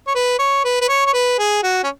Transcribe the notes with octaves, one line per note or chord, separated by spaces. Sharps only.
C#5
B4
C#5
B4
B4
C#5
C#5
B4
G#4
F#4
C#4